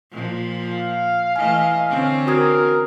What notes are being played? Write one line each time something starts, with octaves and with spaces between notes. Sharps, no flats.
A#2 F3
F5
E3 A3 D#5 G#5
D3 C4 C#4
F#4 A#4 D#6 G#6